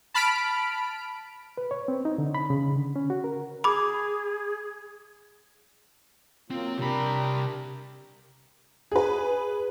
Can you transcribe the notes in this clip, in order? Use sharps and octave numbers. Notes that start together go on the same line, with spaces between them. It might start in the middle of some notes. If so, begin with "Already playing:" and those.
A5 B5 F6 B6 D7
B4
C#5
C4
D#4
D3
B5
C#3
D3
C#4
F#4
A#4
G#4 B5 D6
F#3 A#3 C4 F4
C2 D4 G4 A#4 B5
G#4 B4